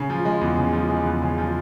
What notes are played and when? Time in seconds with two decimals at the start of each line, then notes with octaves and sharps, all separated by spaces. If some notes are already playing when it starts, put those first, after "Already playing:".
Already playing: C#3
0.10 F3
0.25 G#3
0.41 E2
0.57 C#3
0.73 F3
0.89 G#3
1.06 E2
1.22 C#3
1.38 F3